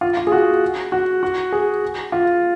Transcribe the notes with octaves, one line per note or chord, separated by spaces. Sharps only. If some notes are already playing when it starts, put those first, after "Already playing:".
F4
F4
G#4
F#4
F#4
F#4
G#4
F4